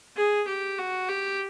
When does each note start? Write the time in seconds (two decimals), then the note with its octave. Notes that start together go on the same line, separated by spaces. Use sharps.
0.17 G#4
0.48 G4
0.78 F#4
1.09 G4